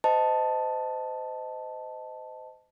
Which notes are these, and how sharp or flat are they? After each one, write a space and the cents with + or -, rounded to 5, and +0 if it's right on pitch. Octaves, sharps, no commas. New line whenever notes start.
C5 -30 D#5 +0 A5 +0